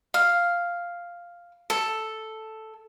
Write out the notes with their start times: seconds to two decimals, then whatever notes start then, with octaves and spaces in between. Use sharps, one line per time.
0.14 F5
1.70 A4